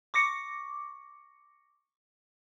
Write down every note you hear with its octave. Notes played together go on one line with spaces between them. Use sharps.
C#6 D6 A#6 C#7